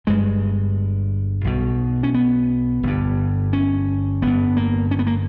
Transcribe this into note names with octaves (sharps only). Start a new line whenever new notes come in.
G1 G2 G#3
B1 B2
C#4
B3
G1 G2
C#4
G1 G2 B3
A#3
C#4
B3
A#3